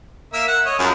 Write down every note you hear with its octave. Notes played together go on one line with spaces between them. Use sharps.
A#3 E5 E6
F#5
C#5 D#5
F#2 F3 G#4 A#4